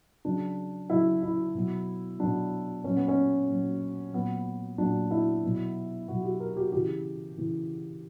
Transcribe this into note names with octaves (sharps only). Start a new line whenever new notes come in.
C#3 F#3 D4
C#3 F#3 E4
E4
B2 F#3
B2 F#3 D4
A#2 F#3 C#4
B3
C#4
A#2 F#3
A#2 F#3 B3
A#2 F#3 D4
E4
B2 F#3
B2 F#3 F#4
G4
A#4
G4
C#3 E3 G4
C#3 E3